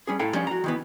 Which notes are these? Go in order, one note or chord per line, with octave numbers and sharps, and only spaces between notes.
G3 C#4 G#4
A2 A4 F5 G5 A#5
F3 G3 C#4
F#4 A#5
D#3 E3 B3